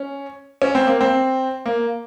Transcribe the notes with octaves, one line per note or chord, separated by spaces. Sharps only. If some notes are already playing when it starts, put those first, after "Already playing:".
Already playing: C#4
C#4
C4
A#3
C4
A#3